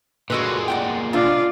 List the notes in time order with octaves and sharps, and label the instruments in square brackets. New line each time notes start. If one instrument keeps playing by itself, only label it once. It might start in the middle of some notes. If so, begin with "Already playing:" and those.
[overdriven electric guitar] A#2 G#3 [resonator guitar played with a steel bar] F#4 A4 B4
[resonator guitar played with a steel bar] D5 F#5 G5
[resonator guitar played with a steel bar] C3 D4 [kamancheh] F4 D5